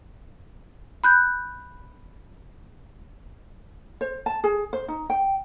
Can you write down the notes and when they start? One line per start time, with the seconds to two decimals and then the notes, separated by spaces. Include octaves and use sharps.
1.04 B5 F#6 G6
4.01 C5
4.26 A5
4.44 G#4
4.73 C5
4.88 D#4
5.10 G5